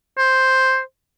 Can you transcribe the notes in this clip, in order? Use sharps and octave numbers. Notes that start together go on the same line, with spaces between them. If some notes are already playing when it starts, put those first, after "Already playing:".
C5